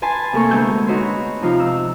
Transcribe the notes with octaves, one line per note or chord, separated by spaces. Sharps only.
B4 G#5 A5 C6
C3 A3 A#3 A4 A#4 C#6
D2 G#3 B3 E6 G6
D#4 F#4 B4 C#5 C6
C3 F3 D#4 F4
E6